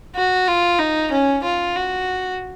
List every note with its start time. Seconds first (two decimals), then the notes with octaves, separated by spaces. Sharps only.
0.16 F#4
0.48 F4
0.79 D#4
1.12 C#4
1.44 F4
1.76 F#4